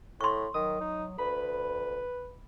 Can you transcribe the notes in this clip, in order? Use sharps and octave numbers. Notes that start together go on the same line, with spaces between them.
A2 C6 C#6
D#3 F#3 D#6
D#4
D2 B4 B5